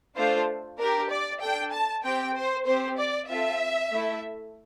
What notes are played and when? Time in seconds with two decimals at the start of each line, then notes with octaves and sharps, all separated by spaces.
0.16 A3 D4 F4 A4 C5
0.78 D4 G4 A#4
1.11 D5
1.41 D4 A4 G5
1.73 A5
2.04 C4 G4 G5
2.35 C5
2.66 C4 G4 C5
2.98 D5
3.29 C4 F4 A4 E5
3.91 A3 E4 A4